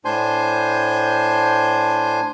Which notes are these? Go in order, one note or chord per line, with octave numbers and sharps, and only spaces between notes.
A2 D4 C5 G#5 C6 G6